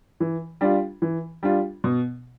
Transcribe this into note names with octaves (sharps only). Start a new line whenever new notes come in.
E3
G3 D4 F4
E3
G3 D4 F4
B2